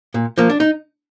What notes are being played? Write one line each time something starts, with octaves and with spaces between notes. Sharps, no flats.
A#2
F3 A#3
D4
D#4